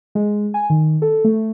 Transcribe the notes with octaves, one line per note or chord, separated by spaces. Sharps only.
G#3
G#5
D#3
A4
A3